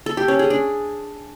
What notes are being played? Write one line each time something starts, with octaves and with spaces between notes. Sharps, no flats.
A4
G4
C#4
G#4
D4